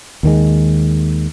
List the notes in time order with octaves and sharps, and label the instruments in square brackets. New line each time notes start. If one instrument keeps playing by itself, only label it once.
[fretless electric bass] D#2 D#3 G#3